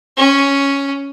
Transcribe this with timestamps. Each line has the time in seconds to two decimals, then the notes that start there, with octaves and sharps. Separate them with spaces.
0.17 C#4